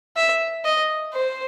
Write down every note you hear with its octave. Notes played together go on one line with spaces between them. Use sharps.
E5
D#5
C5